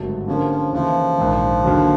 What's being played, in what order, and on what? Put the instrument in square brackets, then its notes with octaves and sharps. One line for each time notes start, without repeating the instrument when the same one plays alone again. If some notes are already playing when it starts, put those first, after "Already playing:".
Already playing: [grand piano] G#1 G2 D3 F#3 A3
[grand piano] D3 G3 A#3 C#4 F4 [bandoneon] F3
[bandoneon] F3
[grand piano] D#2 C#3 E3 [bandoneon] F3
[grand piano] A#1 G#2 D#3
D#2 D3 F#3